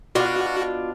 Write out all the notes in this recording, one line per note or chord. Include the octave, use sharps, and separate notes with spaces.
B2 D4 F4 F#4